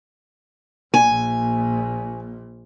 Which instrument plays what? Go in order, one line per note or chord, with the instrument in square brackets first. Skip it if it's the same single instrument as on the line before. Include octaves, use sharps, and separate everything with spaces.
[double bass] A#1 A#2 [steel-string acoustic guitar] G#5